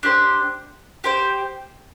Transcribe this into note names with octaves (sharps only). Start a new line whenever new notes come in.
D4 G4 C5
G4 C5 G5